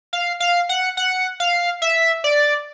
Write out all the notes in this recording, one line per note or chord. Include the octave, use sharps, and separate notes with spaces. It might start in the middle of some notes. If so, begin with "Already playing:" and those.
F5
F5
F#5
F#5
F5
E5
D5